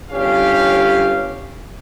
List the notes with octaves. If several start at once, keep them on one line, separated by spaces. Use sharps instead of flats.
G1 C#4 G4 F5